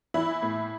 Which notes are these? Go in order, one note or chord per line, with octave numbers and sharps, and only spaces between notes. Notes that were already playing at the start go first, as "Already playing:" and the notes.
E3 E4
A2